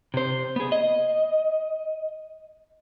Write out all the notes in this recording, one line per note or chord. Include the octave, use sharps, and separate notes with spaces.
C3 C5
B3 G#4
D#5